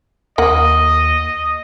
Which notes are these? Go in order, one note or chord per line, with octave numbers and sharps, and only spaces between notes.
D#2 A#3 D#5 F#5